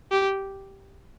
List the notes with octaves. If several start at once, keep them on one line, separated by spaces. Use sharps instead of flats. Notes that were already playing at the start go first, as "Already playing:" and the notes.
G4